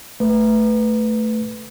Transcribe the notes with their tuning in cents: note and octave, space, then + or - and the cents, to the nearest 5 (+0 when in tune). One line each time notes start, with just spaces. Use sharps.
A3 +0 B4 +5